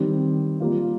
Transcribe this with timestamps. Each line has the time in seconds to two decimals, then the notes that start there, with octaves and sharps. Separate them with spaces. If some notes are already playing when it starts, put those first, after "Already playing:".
Already playing: D#3 G3 C4 G4
0.60 G3 A#3 F4